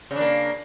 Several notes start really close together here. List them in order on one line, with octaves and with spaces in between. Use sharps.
C#3 D4 A#3